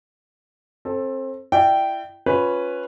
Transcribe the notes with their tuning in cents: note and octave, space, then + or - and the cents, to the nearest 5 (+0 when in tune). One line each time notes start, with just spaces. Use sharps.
C4 +25 A4 +0
E4 +30 D5 +40 G5 -10
C#4 +0 F4 +25 B4 +0